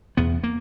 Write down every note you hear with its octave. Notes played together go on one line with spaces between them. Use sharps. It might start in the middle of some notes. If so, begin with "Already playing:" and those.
E2 B2 B3
A#3